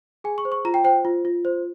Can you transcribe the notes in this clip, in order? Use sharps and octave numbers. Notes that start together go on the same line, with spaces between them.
G#4 G#5
C#6
C5
C#6
F4 A#5
G5
C5 G5
F4
F4
C5